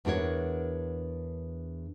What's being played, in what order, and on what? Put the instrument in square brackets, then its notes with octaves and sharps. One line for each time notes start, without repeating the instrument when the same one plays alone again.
[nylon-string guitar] E2 D4 F#4 A#4 C#5